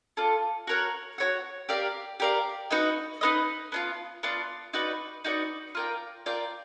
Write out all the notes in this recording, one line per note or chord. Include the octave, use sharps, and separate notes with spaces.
F4 A4 D5
F#4 A#4 C#5 F#5
F#4 A#4 C#5 F#5
G4 A#4 D5 F5
G4 A#4 D5 F5
D#4 F#4 B4 D#5
D#4 F#4 B4 D#5
B3 D4 F4
B3 D4 F4
D#4 F#4 B4 D5
D#4 F#4 B4 D5
F4 A#4 D5 G5
F4 A#4 D5 G5